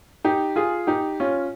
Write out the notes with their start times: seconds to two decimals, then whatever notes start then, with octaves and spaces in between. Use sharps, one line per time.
0.25 D#4 G4
0.56 F4 G#4
0.87 D#4 G4
1.20 C#4 F4